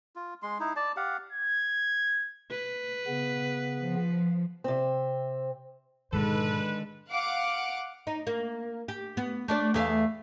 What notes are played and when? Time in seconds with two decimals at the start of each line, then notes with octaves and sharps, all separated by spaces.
0.16 F4
0.43 G#3 C6
0.60 D#4 E4
0.76 D5 A5
0.97 G4 F5 F#5
1.33 G#6
2.51 B4
3.07 C#3 B3
3.78 F3
4.64 C3 C4
6.13 B1 G#2 D3 D#3 G#3 A4 B4
7.09 F5 F#5 D6
8.07 D#4
8.27 A#3
8.88 G4
9.17 B3
9.48 A3 D4 D5
9.74 E2 A3 F5